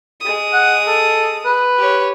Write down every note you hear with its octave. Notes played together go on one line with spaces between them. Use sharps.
G#3 D#6
F#5
A4
B4
G4 C#5